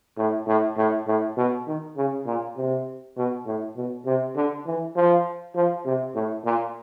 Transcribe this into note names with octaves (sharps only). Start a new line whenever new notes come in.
A2
A2
A2
A2
B2
D#3
C#3
A#2
C3
B2
A2
B2
C3
D3
E3
F3
F3
C3
A2
A#2